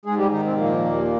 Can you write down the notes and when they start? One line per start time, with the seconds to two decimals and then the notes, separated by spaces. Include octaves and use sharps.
0.05 G#2 G#3 G#4
0.18 G3 G4
0.31 D#3 D#4
0.45 C3 C4
0.58 A#2 F3 A#3
0.85 D#2